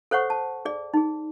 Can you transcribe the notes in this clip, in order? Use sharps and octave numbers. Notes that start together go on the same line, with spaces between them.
A4 C5 C#5 F#5 C#6
A5
G#4 D5
D#4 G#4